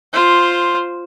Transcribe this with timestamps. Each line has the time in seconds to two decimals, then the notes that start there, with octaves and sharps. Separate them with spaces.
0.13 F4 C5